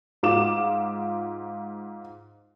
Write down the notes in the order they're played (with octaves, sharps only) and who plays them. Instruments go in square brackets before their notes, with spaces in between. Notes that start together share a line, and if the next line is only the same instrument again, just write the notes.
[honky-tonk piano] G#2 F4 D6 E7